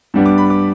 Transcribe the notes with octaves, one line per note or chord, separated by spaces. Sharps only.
G2 G3 B3 D4
D6
B5
D6